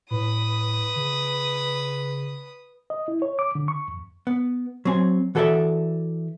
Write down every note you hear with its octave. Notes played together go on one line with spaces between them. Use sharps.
A2 B4 D#6
C#3
D#5
E4
C#5
D6
D3
C#6
F2
B3
F#3 C4 G#5
E3 F#4 A4 B4 D5 E5